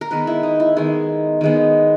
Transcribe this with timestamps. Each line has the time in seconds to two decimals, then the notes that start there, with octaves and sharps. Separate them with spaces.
0.01 A#4
0.11 D#3 G#3 B3 B4
0.27 E4
0.43 D#4
0.60 E4
0.77 D#3 G#3 B3
1.41 D#3 G#3 B3